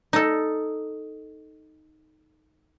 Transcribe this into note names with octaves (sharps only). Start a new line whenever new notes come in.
D#4 A4